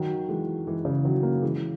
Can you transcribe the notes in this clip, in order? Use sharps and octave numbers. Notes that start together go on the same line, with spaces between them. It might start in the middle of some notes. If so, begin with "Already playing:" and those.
Already playing: D#3 F#3
E3 G#3
E3 G#3
C#3 E3
D#3 F#3
F#3 A#3
E3 G#3